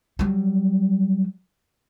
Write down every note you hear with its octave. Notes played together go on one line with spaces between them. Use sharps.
F#3 G3